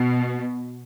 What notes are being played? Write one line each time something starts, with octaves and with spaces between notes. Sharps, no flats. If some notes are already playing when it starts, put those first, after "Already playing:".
Already playing: B2